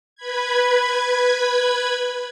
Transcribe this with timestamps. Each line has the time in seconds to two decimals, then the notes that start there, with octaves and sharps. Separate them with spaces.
0.16 B4 B5 G#6